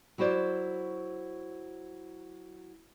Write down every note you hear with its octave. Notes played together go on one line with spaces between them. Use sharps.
F#3 E4 F#4 C5 D5